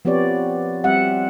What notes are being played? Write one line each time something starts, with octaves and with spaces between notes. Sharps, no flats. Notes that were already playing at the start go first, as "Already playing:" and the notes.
F3 B3 C4 G4 C#5 D5
G3 C4 E5 F#5